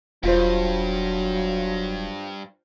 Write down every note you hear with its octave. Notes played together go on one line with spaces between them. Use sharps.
E1 G2 F#3 F4 C5